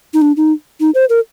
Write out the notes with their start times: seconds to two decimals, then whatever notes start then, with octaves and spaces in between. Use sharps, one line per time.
0.14 D#4
0.22 D4
0.37 D#4
0.80 D#4
0.95 C5
1.10 A#4